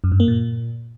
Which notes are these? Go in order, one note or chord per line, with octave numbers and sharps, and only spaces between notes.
F#2
G2
A#3
A#2